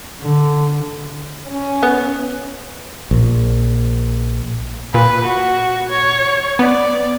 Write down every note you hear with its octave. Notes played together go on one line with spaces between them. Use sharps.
D3
C#4
B3
A#1
A#2 B4
F#4
C#5
B3 D5